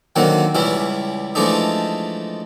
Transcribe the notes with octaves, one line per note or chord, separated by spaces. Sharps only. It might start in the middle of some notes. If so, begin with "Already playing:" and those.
D3 D#3 F#3 A#3 C4 F#5
C#2 E3 G3 C#4 E4
E3 F3 G#3 A3 D4 D#4